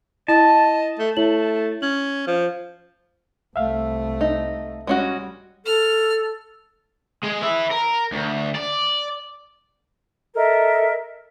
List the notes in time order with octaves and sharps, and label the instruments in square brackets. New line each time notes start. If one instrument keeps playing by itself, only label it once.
[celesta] E4 [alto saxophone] D#5 [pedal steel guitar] A5
[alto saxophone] A3
[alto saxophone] A3 [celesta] E4 C#5 F#7
[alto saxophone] C#4 [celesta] F#7
[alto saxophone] F3
[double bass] C2 A3 [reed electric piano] E5 F5
[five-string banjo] D#4
[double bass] G3 [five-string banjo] G#3 C#4 F#4
[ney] A4 [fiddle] F6
[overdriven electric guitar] G#3
B4 E5
A#4
D2
D5
[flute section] A4 A#4 D#5 E5